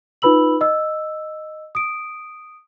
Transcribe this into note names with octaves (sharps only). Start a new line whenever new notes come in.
D#4 F4 B4 B5 E6 F#7
D#5 E6
D#6 D7